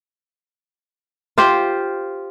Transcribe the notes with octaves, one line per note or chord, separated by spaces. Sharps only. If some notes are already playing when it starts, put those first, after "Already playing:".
F4 G4 C5